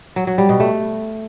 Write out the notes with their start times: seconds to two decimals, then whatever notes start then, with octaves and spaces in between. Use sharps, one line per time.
0.16 F#3
0.27 F#3
0.38 G3
0.49 B2
0.60 A3